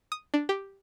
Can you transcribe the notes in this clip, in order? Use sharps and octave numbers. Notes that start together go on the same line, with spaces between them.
D#6
D4
G4